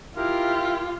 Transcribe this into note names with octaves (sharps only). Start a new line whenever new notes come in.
E4 F4 G4 A#4